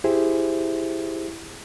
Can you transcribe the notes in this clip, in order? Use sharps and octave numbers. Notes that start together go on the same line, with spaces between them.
E4 G4 G#4 C5 E5